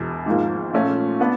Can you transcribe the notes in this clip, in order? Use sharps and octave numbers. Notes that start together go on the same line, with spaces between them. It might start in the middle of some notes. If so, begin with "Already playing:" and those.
Already playing: E1 E2 B2
G#1 G#2 F3 A#3
A#2 F3 A3 C#4 F4
B3 D4